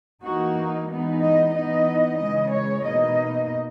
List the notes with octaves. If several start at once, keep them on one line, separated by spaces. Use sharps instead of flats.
E3 A#3 D#4 F#4
E3 G#3 B3 D#4
D#5
E3 B3 D#4 D#5
C#3 E3 G#3 D#5
C#5
B2 A#3 D#4 D#5